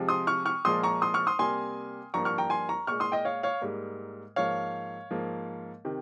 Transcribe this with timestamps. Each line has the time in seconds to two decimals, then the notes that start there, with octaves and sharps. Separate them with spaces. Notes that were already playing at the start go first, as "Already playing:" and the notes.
Already playing: C3 F3 G#3
0.09 C6 D#6
0.27 C#6 F6
0.46 C#6 F6
0.65 A#2 F3 G#3 C6 D#6
0.83 A#5 C#6
1.02 C6 D#6
1.14 C#6 F6
1.27 C6 D#6
1.39 C3 G3 A#3 G#5 C6
2.14 G2 F3 A#3 A#5 C#6
2.25 C#6 F6
2.38 G5 A#5
2.50 G#5 C6
2.69 A#5 C#6
2.87 A#2 G#3 C#6 F6
3.00 C6 D#6
3.12 D#5 G5
3.25 C#5 F5
3.43 C#5 F5
3.61 G#2 G3 A#3
4.36 G#2 F3 A#3 C#5 F5
5.11 G#2 F3 A#3
5.85 C3 D#3